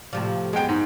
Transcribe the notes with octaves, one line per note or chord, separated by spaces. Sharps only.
A2 C3 F3
F#2 G#3 B3 G5
G#2